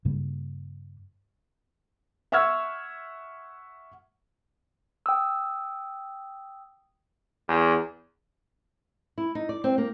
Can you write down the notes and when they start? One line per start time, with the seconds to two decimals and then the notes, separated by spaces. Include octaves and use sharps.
0.05 G2 C#3 G3 A#3
2.32 E5 F#5 C#6 E6 F6 G#6
5.06 G5 D#6 E6
7.48 E2
9.18 E4
9.35 D#4
9.49 D5
9.64 C4
9.78 A#3